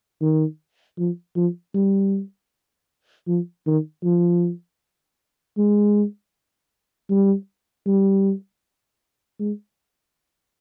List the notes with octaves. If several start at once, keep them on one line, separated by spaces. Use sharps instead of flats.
D#3
F3
F3
G3
F3
D#3
F3
G#3
G3
G3
G#3